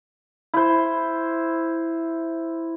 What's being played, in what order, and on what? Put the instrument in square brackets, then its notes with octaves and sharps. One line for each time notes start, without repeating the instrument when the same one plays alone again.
[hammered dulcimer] E4 C5